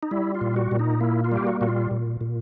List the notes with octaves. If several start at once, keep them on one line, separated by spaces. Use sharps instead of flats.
D#4
G3 E4
F4
A#2
F#4
A#2
D#4
A#3 E4
F4
G3 G4
F#4
A#2 F#4
F4
A#2
A#2